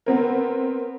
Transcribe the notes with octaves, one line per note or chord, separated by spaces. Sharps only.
B3 C4 A#4